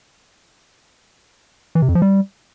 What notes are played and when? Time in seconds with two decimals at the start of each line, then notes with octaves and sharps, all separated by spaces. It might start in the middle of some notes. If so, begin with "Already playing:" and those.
1.75 E3
1.82 C3
1.89 F2
1.95 F3
2.02 G3